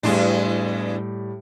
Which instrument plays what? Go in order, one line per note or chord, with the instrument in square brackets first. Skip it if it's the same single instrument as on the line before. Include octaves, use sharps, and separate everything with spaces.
[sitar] E2 G#3 D4 [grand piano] A2 G3